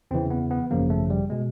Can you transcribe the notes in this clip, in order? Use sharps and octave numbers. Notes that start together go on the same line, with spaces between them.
E2 C#3 E3 C4
B3
B3
G#1 F#2 C#3 F3 A#3
A3
G3
B2 G#3